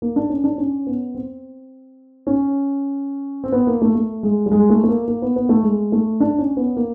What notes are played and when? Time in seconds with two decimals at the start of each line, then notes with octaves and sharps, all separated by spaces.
0.02 A#3
0.16 D4
0.29 C#4
0.44 D4
0.58 C#4
0.87 B3
1.15 C4
2.27 C#4
3.44 C4
3.52 B3
3.67 A#3
3.82 A3
3.95 A3
4.23 G#3
4.46 G3
4.52 G#3
4.70 A3
4.84 A3
4.89 A#3
5.08 A#3
5.22 B3
5.36 B3
5.49 A3
5.63 G#3
5.92 A3
6.20 D4
6.38 C#4
6.57 B3
6.76 A#3